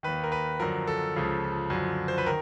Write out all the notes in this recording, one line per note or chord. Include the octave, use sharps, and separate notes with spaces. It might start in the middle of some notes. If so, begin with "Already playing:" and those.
D#2 D#3 B4
A#4
B4
F#2 D3 F3 A#4
A4
C#2 C#3 F3
F#2 D3 F3
C5
B4
D#3 A#4